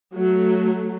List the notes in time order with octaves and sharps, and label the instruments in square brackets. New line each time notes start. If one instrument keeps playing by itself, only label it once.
[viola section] F#3 A3